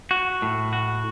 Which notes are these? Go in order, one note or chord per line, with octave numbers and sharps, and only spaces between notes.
F#4
A2
F#4